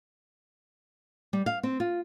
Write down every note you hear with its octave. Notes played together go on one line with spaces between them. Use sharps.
G3
F5
C4
F4